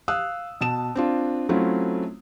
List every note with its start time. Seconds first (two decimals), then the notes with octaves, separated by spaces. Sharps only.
0.08 F5 D#6 E6 F#6
0.61 B2 A5 E7
0.95 C4 D4 F4
1.49 F#3 A3 C4 C#4 E4 F4